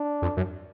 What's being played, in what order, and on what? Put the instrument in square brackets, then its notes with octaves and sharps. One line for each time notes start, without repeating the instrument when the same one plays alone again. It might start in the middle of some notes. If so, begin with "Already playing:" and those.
Already playing: [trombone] D4
[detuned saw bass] F2
F#2